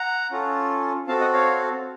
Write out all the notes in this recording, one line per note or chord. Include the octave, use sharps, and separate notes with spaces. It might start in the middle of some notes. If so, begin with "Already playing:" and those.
Already playing: F#5 A#5
C#4 F4 A4
C4 F#4 A4 F5 A5
D#5 F#5
C#5 F5